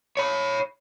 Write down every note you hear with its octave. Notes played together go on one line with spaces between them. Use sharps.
C#5 B5